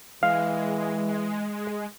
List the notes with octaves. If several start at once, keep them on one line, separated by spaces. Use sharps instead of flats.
E3 G#3 F5